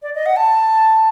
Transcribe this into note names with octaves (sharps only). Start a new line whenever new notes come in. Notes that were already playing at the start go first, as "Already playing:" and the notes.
D5
D#5
F#5
A5